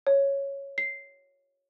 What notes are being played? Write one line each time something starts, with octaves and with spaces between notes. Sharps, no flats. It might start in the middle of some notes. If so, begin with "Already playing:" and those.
C#5
C7